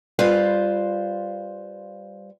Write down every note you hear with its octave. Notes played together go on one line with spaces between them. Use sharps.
G3 F4 B4 C5 F5